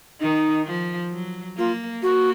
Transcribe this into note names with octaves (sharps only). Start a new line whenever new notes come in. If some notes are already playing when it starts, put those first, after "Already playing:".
D#3 D#4
F3
F#3
A#3 F4
A#3 F#4